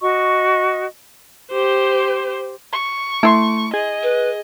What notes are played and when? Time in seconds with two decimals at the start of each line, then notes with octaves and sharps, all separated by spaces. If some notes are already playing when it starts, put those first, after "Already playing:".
0.02 F#4 D#5 C#6
1.51 G4 C5
2.73 C#6
3.23 A3 E4 C6
3.74 G#4 D#5
4.03 B4